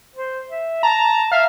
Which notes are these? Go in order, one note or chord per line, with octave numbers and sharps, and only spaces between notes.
C5
E5
A5 A#5
E5 F5